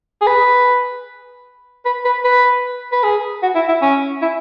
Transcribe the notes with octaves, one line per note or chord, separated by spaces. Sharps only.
G#4
B4
B4
B4
B4
B4
G#4
F#4
E4
E4
C#4
E4